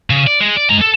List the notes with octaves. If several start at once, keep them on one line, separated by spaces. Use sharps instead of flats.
C#3
D5
G#3
D5
G#3 A#5
A4